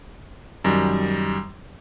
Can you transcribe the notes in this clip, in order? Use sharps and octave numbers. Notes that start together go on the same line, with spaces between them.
F#2 D#3 G3